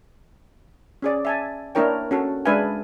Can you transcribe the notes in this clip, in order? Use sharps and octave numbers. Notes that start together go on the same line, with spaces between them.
C#4 G#4 D5
E5 G#5 A5
A#3 D4 E4 A#4 C#5 G5
C#4 F#4 A4
G#3 D4 B4 E5 F5 G#5